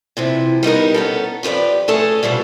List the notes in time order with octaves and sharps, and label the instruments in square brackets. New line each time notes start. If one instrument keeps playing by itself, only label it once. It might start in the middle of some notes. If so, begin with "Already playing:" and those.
[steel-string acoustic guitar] C3 E3 F3
G3 B3 D#4 A#4
B3 C#4 A4
F3 G4 A4 B4 D5
A3 C#4 G#4 A4 A5
B2 F3 G3 A#3